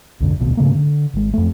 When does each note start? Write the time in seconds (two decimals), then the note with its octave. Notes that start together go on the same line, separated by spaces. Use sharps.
0.20 B1 F2 G#2 D3
0.39 D1 A#1 D#2 B2
0.57 G#2 C#3 A3 A#3
0.75 D3
1.13 G#1 G#3
1.34 F2 A3